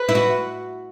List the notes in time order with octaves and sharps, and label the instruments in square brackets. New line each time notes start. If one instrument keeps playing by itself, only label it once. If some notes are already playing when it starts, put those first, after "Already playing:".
Already playing: [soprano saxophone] B4
[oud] E4
F#4